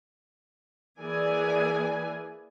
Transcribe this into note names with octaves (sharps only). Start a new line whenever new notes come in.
E3 A#3 G#4 D5 G#5